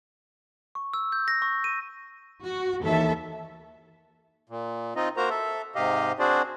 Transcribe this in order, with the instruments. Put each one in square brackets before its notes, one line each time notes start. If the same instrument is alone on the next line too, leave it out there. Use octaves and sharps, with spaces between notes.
[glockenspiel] C#6
E6
G6
A#6
C#6
D#7
[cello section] F#4
D#2 E3 A4 E5
[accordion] A#2
C4 D#4 F4 D#5
A#3 F#4 A#4 C5 A#5
A4 E5
G#2 C3 G4 D#5 F5
C4 D4 F#4 G#4 C5 D5